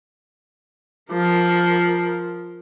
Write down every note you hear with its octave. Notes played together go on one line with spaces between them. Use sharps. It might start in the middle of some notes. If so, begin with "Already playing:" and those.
F3 A#4